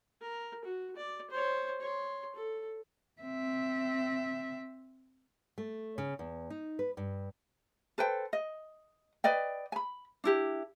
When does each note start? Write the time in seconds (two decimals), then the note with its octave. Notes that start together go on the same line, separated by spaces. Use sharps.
0.22 A#4
0.65 F#4
0.96 D5
1.30 C5 C#5
1.81 C#5 C6
2.35 A4
3.22 C4 E5
5.58 A3
5.98 C#3
6.19 E2
6.50 D#4
6.79 B4
6.97 G2
7.98 A4 B4 C5 G5
8.33 D#5
9.24 B4 D5 D#5 G5
9.72 G#5 B5
10.24 D4 E4 G4